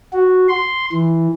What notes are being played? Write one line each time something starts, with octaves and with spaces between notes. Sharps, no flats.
F#4
C6
E3